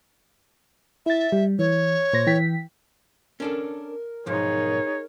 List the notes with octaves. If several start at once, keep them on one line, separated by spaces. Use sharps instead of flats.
E4 E5 A6
G3
E3 C#5
A#2 C5 A#6
E3 G5 B6
C#4 D4 A4 A#4
B1 G#2 F3 D#4 G#4 C#5